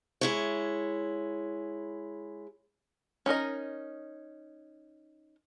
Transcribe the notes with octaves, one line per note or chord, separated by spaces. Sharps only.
G#3 E4 C#5
C#4 D#4 A#4 D#5